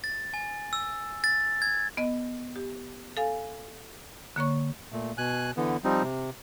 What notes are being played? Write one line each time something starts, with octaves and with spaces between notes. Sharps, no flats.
A6
G#5
E6
A6
G#6
B3 D#5
G4
A4 F5 G#5
D3 A#3 C#5 C#6
A#2 A3
B2 G#5 F#6
D3 E3 B3
F3 G3 C4 D#4
C3